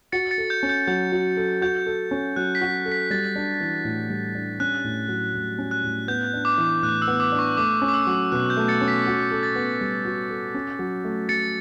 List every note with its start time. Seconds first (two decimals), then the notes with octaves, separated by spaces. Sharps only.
0.12 F#4 A6 C#7
0.31 A6 C#7
0.38 A4
0.50 G6
0.63 C#4
0.69 G6
0.87 F#3 G6
1.12 F#4
1.37 A4
1.61 F#4 G6
1.86 A4
2.11 C#4
2.36 F#3 F#6
2.55 B6
2.61 F#4
2.86 A4
2.92 B6
3.10 G3 A6
3.36 D4
3.60 E3
3.85 A2
4.10 G3
4.35 D4
4.60 C#4 F#6
4.84 A2
5.09 F#3
5.34 A2
5.58 C#4
5.71 F#6
5.84 A2
6.08 B3 G6
6.33 D4
6.45 D6
6.58 E3
6.82 A2 F#6
7.02 E6
7.08 B3
7.20 D6
7.32 D4
7.39 C#6
7.57 A3 D6
7.82 C#4
7.88 D6
7.94 E6
8.07 F#3
8.32 B2 F#6
8.50 G6
8.57 A3
8.68 A6 C#7
8.81 C#4
8.88 B6
9.06 F#4
9.31 A4
9.43 A6
9.55 B3
9.81 G3
10.05 F#4
10.30 A4
10.54 C#4
10.79 F#3
11.04 A3
11.29 F#3 A6 C#7